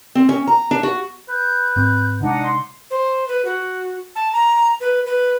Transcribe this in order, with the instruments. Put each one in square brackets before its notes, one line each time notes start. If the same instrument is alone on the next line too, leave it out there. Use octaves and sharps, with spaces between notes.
[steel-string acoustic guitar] C4
C#4
A#5
D4
F#4
[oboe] B4 [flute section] G6
[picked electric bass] G#2 C4
[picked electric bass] C3 G#3 [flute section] D4 D#4 F#5
[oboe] C6
[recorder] C5
B4
F#4
A5
A#5
B4
B4